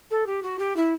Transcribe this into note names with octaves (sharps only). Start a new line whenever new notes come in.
A4
G4
F#4
G4
E4